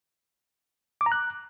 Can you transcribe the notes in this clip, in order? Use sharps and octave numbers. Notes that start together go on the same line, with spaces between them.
D6
A#5
F#6